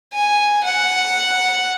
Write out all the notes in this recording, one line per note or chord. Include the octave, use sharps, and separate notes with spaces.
G#5
F#5